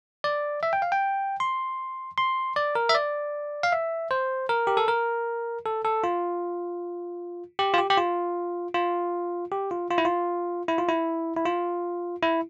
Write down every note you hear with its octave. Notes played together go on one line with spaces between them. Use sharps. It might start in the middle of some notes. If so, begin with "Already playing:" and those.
D5
E5
G5
F5
G5
C6
C6
D5
A#4
E5
D5
F5
E5
C5
A#4
G4
A4
A#4
A4
A4
F4
G4
F4
G4
G4
F4
F4
G4
F4
F4
E4
F4
E4
F4
E4
E4
F4
E4